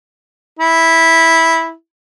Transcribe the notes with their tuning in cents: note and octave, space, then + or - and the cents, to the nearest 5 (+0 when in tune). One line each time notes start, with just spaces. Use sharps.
E4 -10